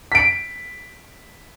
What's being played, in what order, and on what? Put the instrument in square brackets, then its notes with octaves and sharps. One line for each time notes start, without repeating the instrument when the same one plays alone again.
[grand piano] B6 D7